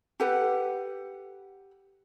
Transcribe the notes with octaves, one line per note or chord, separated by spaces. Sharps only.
G4 A4 B4 F#5